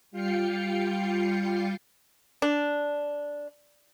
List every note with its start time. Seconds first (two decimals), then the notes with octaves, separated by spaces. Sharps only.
0.11 G3 F4 F5 G5 C7 C#7
2.42 D4